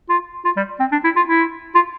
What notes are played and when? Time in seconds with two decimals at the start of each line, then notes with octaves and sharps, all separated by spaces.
0.09 F4
0.45 F4
0.57 G3
0.80 C4
0.92 D4
1.04 E4
1.16 F4
1.28 E4
1.75 F4